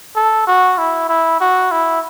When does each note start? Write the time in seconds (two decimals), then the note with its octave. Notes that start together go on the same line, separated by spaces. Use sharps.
0.16 A4
0.47 F#4
0.78 E4
1.09 E4
1.41 F#4
1.72 E4